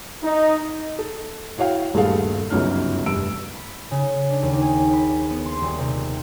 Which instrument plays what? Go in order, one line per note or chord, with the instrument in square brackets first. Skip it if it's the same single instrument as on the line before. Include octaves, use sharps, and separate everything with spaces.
[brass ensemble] D#4
[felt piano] A4
E4 F#4 C#5 F5 G5
D#1 G2 G#3 A3 A4 F5
G1 C#2 F#2 C#4 D#4 F6
F1 G2 E6 D7
[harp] B5
C#3
D4
D#2
G#4
B5
B3
C6
D#1
C3